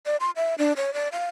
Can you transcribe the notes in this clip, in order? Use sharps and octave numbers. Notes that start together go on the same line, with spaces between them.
D5
C6
E5
D4
C#5
D5
F5